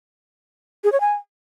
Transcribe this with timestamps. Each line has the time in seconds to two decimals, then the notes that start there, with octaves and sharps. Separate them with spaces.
0.84 G#4
0.92 C#5
1.01 G#5